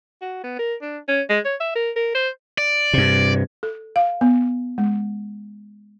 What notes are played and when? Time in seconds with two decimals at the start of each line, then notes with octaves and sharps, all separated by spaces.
0.21 F#4
0.44 B3
0.59 A#4
0.82 D4
1.08 C#4
1.29 G#3
1.45 C#5
1.60 E5
1.75 A#4
1.96 A#4
2.15 C5
2.58 D5
2.93 G2 C3
3.63 A4
3.96 F5
4.21 B3
4.78 G#3